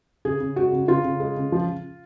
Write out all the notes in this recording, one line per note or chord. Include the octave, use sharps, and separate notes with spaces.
C#3 G#4
C#3
G#3 F#4
C#3
C#3 F4
C#3
G#3
C#3
F3